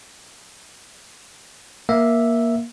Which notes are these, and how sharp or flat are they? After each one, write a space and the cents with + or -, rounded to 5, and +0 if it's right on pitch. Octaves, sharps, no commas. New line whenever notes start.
A#3 +15 E5 +0